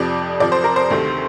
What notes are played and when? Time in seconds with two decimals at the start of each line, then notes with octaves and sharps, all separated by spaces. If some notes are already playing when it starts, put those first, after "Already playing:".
Already playing: F2 C3 F3 D5
0.40 F2 C3 F3 D5
0.52 C5
0.64 A#4
0.76 C5
0.90 D2 C3 D#3 A3